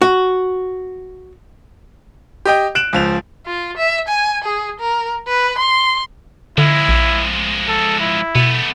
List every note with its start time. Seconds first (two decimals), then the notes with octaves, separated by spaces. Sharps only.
0.02 F#4
2.45 G4 D#5 G5
2.75 F#6 D7 E7 F#7
2.93 C#2 F3 F7
3.46 F4
3.77 E5
4.08 G#5
4.44 G#4
4.80 A#4
5.28 B4
5.58 C6
6.58 D3 F3 G#3 E4
6.89 A#1
7.68 A4
8.00 E4
8.35 B2 A3 B3